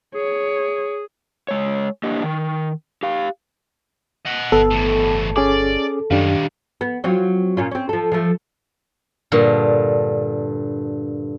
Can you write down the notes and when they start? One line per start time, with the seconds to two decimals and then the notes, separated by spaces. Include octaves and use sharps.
0.15 G#4 C#5
1.48 G#3 C#5
2.03 A#3 D4 G4 D#5
2.23 D#3
3.03 G4 F5
4.25 D#5 F#5
4.52 G1 B3 A4
4.71 E2 A2
5.36 C#4 G#4 D5 D6
6.11 F#2 D#3 G3 D4 G4 F5
6.81 B3
7.04 F#3 C4 F4
7.57 A#2 C#4 F4
7.71 C4 C#4
7.89 F3 A4
8.12 F3 A3
9.32 G2 A#2 D3